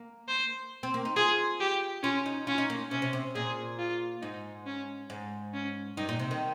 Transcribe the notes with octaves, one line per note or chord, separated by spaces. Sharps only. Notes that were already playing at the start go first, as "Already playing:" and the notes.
Already playing: A#3
C5
C4
A#3
D#4
F4 G#4
G4
C#4 F4
D#4
C#4 F4
D#4
A#3
C3 C#4
C3
C3
A#2 G#4
F4
G#2 D#4
C#4
G#2
C#4
G2 D#4
A#2
C3
D#3